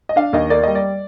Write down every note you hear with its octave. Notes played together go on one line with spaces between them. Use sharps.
D#5
D4 F5
D#2 D#5
A#3 D5
G3 D#5
D5